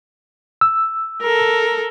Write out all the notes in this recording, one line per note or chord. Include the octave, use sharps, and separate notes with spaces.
E6
A4 A#4